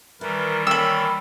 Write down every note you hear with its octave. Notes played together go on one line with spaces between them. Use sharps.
D#3 E3 G3 E4 A#4 B4
A#3 C#4 G5 B5 E6